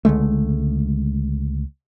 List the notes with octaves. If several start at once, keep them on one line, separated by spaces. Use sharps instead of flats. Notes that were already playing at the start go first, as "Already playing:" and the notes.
C#2 D3 G#3 A3